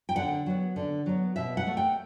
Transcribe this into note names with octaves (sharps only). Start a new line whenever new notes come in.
G5
D3 F#5
F#3 B3
D3
F#3 B3
B2 E5
F#5
A3
G5